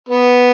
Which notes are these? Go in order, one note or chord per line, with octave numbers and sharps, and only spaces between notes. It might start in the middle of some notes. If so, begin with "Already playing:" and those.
B3